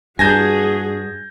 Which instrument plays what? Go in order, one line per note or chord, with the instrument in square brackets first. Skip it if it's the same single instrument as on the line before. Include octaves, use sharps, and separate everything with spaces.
[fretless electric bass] G2 [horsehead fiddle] F#4 G#4 [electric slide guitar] G#5 A5 [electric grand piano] G6 G#6 A#6